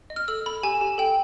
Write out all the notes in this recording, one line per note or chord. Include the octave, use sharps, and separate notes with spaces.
D#5
F6
A4 E6
A4 B5
G4 G#5
G4
A4 G5